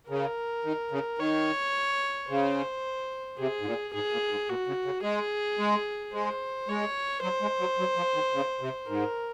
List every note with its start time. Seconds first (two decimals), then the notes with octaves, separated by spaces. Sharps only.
0.09 C#3 A#4
0.64 D#3
0.91 C#3
1.19 D#3 C#5
2.29 C#3 C5
3.39 C3 G#4
3.61 G#2
3.66 A#2
3.94 G#2 G#4
4.12 A#2
4.30 G#2
4.49 A#2 F#4
4.67 C#3
4.85 C#3
5.03 G#3 G#4
5.59 G#3
6.13 G#3 C5
6.68 G#3 C#5
7.23 F#3 C5
7.41 G#3
7.60 F#3
7.79 F#3
7.97 F3
8.14 D#3
8.33 C#3
8.61 C3
8.88 G#2 A#4